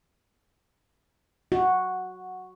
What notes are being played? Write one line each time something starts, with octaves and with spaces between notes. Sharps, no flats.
F#4